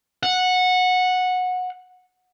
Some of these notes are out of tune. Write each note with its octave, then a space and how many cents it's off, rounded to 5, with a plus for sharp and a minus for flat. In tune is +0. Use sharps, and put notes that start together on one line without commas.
F#5 -15